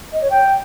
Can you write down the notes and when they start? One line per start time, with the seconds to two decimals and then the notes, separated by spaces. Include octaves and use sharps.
0.13 D#5
0.22 C#5
0.30 G5